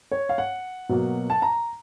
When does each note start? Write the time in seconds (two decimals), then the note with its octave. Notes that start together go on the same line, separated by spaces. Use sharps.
0.11 C#5
0.29 F5
0.38 F#5
0.89 B2 F#3 A#3
1.30 A5
1.42 A#5